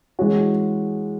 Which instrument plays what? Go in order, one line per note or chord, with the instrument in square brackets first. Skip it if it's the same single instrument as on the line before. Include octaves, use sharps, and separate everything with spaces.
[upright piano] E3 G#3 C#4 F#4